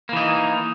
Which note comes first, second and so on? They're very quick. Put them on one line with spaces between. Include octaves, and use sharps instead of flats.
A#3 E3 D#4